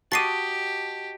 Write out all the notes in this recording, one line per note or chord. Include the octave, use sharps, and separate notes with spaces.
F#4 G4 D#5 A5 D6 A6 C7 D#7